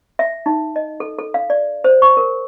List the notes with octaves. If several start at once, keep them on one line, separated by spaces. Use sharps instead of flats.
E5
D#4
D#5
A4
A4
F5
D5
C5
C#6
A#4